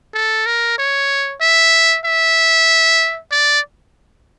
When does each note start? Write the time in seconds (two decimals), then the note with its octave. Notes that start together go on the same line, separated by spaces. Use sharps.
0.14 A4
0.46 A#4
0.78 C#5
1.41 E5
2.05 E5
3.31 D5